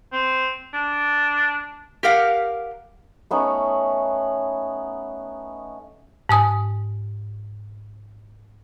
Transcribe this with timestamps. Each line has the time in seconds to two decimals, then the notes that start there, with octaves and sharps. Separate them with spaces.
0.12 C4
0.74 D4
2.03 G4 A#4 F5 F#5
3.31 A3 B3 C#4 D#4
6.29 G#2 G#5 D#6